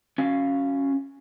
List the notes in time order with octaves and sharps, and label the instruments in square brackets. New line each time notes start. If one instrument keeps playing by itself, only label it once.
[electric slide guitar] C#4 F#4 F5